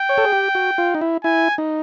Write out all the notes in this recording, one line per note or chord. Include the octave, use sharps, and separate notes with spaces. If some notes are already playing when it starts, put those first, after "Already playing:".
Already playing: G5
C#5
A4
G#4
G4
F#4
F4
D#4
E4
E4 G#5
D#4